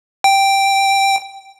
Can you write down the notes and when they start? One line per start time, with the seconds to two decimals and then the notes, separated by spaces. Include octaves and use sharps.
0.24 G5